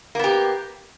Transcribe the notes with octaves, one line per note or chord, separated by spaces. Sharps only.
A#3 B3 G4